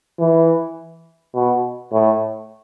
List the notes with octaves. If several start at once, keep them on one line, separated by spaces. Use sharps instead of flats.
E3
B2
A2